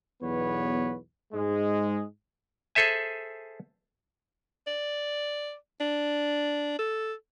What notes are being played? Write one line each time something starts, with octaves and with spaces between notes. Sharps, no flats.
B1 E2 B3 B4 C#5
G#2 G#3
G#4 A4 C5 E5 G#5
D5
D4
A4